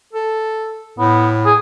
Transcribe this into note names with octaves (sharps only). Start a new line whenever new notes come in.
A4
A2 B3
G#4